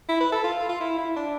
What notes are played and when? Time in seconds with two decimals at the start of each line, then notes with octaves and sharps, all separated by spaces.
0.09 E4
0.20 B4
0.32 A4
0.44 F4
0.69 F4
0.80 E4
0.98 E4
1.16 D4